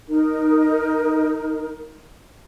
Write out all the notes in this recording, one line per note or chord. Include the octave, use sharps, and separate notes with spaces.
D#4 A#4